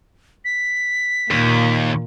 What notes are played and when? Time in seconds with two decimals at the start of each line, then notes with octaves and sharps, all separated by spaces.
0.45 B6
1.31 D#2 A#2